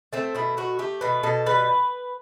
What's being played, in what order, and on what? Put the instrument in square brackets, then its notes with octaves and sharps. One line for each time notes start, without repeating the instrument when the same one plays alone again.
[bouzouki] A3 C4
B2 E4
A3 F#4
A3 G4
B2 B4
B2 A4
G3 B4